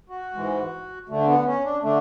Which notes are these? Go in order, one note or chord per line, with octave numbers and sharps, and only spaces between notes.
F#4
G#2 E3 G#3
D2 D3 A3
B3
C#4
D4
D3 A3 D4